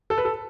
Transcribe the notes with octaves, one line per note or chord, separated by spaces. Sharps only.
A4
B4
A4